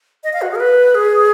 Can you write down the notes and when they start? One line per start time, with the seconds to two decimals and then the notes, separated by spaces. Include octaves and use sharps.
0.24 D#5
0.33 F5
0.42 F#4
0.51 G#4
0.55 A#4
0.60 B4
0.95 G#4